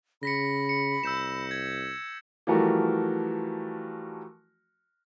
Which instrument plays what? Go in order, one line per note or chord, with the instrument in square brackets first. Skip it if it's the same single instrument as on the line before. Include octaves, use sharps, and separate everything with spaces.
[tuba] C#3 [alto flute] B5 [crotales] A#6 B6 C#7
[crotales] C#7
[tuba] C2 [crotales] E6 G6 E7
[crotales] G#6
[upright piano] E3 F3 G3 A3 F#4 A#4